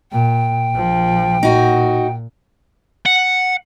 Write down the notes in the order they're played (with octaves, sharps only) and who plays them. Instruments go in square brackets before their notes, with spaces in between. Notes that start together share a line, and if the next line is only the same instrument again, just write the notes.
[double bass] A#2 [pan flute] G5
[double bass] A#1 F3
[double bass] A#2 [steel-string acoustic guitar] D#4 F#4
[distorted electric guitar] F#5